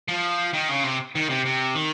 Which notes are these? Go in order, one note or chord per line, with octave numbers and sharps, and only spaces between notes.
F3
D#3
C#3
C3
D#3
C3
C3
D#3